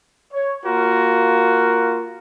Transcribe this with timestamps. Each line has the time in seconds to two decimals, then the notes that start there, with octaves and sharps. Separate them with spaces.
0.33 C#5
0.66 A#3 F4 F#4 A#4